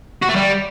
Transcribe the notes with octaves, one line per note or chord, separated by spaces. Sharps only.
F#4
A3
G3